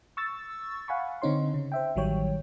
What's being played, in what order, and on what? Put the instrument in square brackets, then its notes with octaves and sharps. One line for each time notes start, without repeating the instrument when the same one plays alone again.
[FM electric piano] C#6 E6 A6
F5 F#5 G#5 B5 C#6
D3 C4 D#4 C#5 C6
C#3
C5 E5 G5
A1 D#3 F#3 G3 C#5 G5